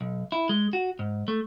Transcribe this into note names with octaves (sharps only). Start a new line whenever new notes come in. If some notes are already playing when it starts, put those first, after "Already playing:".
B1
E4
G#3
F#4
G#2
A3